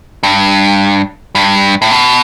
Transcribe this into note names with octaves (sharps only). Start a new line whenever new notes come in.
G2
G2
A2
B2